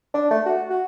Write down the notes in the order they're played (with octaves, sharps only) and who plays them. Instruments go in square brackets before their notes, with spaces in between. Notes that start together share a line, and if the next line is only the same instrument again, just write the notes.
[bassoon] D4
A3
F#4
F#4